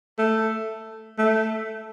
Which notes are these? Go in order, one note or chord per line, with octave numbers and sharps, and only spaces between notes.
A3
A3